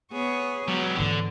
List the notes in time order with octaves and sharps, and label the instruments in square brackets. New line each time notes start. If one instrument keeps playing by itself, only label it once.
[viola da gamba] B3 G#4 C#5
[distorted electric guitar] F#3 G4 [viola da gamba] B3
[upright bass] G#2 E3 [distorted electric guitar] D3